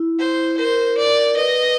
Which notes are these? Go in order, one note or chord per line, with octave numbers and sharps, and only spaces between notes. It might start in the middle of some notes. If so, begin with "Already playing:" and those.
Already playing: E4
C5
A#4 C5
D5
B4 D#5